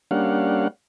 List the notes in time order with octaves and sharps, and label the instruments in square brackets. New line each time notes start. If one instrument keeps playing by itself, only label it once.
[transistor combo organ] G3 A#3 C#4 D4 F5 F#5